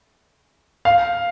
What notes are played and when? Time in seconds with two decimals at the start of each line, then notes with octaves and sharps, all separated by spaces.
0.85 F5